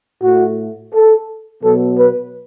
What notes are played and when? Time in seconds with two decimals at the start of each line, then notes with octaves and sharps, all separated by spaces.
0.24 A2 A3 F#4
0.94 A4
1.63 B2 F#3 B3 A4
1.98 B4